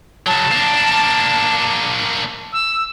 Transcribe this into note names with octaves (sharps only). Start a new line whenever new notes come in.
C#3 F#3 A5
A#3 D4
E6